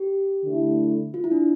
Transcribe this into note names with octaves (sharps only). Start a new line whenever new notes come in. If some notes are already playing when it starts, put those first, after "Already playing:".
Already playing: G4
D3 A3 E4
F4
E4
D4